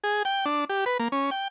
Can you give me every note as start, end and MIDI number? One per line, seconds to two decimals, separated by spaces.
0.04 0.23 68
0.25 0.45 79
0.46 0.65 62
0.69 0.85 67
0.86 0.98 71
0.99 1.08 58
1.12 1.30 61
1.31 1.48 79